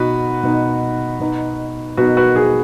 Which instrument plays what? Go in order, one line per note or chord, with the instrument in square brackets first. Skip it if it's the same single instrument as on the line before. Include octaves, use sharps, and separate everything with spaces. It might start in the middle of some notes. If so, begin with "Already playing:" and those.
Already playing: [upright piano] B2 B3 D#4 F#4 B4
B2 B3 D#4
B2 B3 D#4
B2 B3 D#4 F#4 B4
F#4 B4
G#4